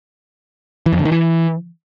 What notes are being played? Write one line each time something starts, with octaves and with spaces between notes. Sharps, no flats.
E3
F2
D3
D#3
E3